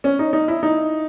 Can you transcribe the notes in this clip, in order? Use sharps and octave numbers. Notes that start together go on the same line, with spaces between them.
C#4
D#4
D#4
E4
D#4